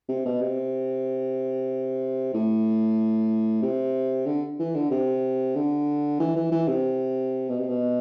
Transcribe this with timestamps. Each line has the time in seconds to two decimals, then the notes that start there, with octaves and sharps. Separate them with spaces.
0.09 C3
0.25 B2
0.41 C3
2.34 A2
3.62 C3
4.26 D3
4.59 E3
4.75 D3
4.91 C3
5.56 D3
6.20 E3
6.36 E3
6.51 E3
6.68 C3
7.49 B2
7.59 C3
7.68 B2